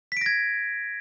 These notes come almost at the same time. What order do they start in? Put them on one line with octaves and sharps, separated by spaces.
B6 D7 A#6 G#6